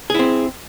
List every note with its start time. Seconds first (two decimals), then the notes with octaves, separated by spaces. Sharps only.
0.10 G#4
0.14 E4
0.19 C4